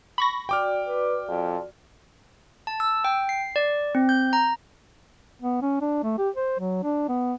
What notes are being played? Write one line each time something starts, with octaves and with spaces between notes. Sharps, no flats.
B5 C#6 A#6
F#4 D5 G5 D6 F6
B4
F2
A5
E6
G5
C7
D5
C4
G6
A#5
B3
C#4
D4
A3
G4
C5
F#3
D4
B3